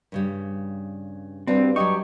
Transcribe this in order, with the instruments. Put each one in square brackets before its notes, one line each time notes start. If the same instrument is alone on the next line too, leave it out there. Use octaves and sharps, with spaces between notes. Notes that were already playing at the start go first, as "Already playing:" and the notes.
[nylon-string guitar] G2 C#3 G3
[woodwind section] G2 [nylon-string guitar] G3 F#4 B4 [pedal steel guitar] C4
[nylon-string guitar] F#3 G3 D#5 [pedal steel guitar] G4 C#6